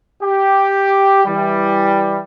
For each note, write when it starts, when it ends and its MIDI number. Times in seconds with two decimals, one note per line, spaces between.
0.22 1.23 67
1.25 2.19 52
1.25 2.19 55